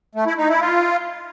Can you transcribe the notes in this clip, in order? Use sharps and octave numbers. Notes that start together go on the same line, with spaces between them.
A3
E4
D#4
E4
F4